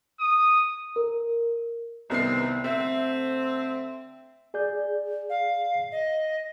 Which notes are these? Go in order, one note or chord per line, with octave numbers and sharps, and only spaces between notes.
D#6
A#4
C2 D#3 B3 C4 C7
D3 A3 C4 E5
G#4 D5 G6
F5
D#5